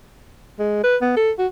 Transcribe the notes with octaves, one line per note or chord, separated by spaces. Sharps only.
G#3
B4
B3
A4
F#4